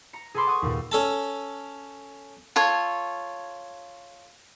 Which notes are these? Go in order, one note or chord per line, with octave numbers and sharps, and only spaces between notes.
A#5 C#7
G#4 A4 A5 B5 C6 D6
F#5 C#6 D#6
D#2 A#2
C#4 A4 A5
F4 A4 C#5